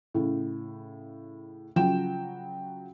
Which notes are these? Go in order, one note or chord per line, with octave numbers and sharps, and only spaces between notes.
A2 C#3
C#3 F3 F#3 G5 E7